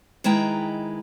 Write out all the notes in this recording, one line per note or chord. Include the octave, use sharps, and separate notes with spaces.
D#3 G#3 E4 B4 G5 A#5